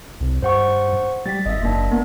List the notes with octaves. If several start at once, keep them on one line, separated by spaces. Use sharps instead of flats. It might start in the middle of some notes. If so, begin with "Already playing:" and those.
C2
G2 C5 F#5 C#6
G3 A6 B6
G#1 D#5 E5
F#1 A#3 D4
A#3 B3